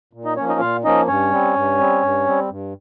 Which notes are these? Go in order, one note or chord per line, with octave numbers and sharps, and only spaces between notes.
A#2
D#4 D#5
F3 A#3 C#4 C#5
D#4 D#5
A#2 F4 F5
F3 A#3 C#4 D#4 D#5
G2 C#4 C#5
G3 C4
G2
G3 C4
G2
G3 C4
G2